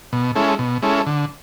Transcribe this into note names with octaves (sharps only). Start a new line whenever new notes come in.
B2
G#3 C#4 E4 A4
B2
G#3 C#4 E4 A4
D3